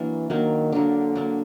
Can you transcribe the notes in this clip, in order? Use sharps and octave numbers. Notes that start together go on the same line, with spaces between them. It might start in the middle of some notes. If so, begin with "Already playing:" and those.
Already playing: E3 F#3 A#3 D4
D#3 F#3 A#3 D4
D3 F#3 A#3 D4
F#3 A#3 D4